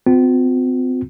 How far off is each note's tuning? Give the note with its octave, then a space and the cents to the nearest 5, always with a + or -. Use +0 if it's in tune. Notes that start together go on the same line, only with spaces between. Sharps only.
C4 -40 F4 +45